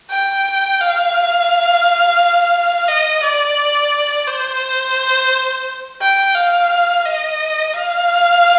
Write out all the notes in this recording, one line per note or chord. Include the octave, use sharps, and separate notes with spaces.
G5
F5
D#5
D5
C5
G5
F5
D#5
F5